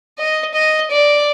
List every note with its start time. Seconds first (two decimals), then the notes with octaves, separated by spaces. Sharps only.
0.18 D#5
0.54 D#5
0.91 D5